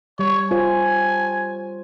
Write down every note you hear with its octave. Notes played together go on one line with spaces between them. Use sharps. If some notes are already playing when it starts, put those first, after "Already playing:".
G3 C#5
F4 C5 C#5 G#5